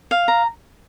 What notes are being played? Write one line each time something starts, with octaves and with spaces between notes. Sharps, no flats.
F5
A#5